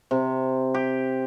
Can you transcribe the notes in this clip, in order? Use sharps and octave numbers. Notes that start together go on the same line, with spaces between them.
C3
G4